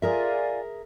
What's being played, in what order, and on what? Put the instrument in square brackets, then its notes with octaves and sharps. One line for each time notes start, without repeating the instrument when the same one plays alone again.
[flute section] F4 D5 G#5 [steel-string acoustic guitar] G#4 A#4 E5